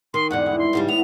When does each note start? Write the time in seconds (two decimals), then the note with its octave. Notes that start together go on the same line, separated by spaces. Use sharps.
0.14 D#3 C6
0.31 E2 G#2 D3 G3 F#5
0.46 E3 G#3
0.59 C6
0.73 G#2 C#3 G3
0.88 A2 B3 F7